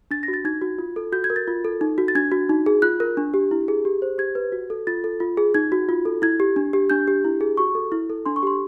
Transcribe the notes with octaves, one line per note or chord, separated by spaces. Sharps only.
D4 A6
A#6
F#4
A6
D#4 G#6
F#4
F4
A4
F#4 G6
G#6
A#4
A6
F4
A4
D#4
F#4
A6
D4 G#6
F#4
D#4
G#4
F4 F#6
A#4
D4
G4
E4
G#4
G4
C5
G4 G#6
B4
F#4
A4
F4 A6
A4
F4
G#4
D#4 G#6
F#4
F4
A4
E4 G#6
G4
D4
G4
D4 G6
G4
E4
G#4
F#4 C#6
A4
E4
A4
D4 C6
C#6
G4 C6